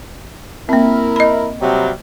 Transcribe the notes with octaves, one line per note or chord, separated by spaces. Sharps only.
A#3 C4 E4 A#4
D#5 B5
C3 F#3 G3